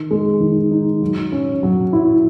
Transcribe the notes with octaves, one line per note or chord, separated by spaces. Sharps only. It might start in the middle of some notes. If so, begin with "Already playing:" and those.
Already playing: D#3
G#3
D#3
D#4
F#3
C#4
F#3
E4